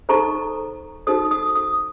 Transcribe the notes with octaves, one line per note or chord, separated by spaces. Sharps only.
D#4 A4 C5 A#5 C#6
D#4 F#4 A4 C5 D#6
D#6
D#6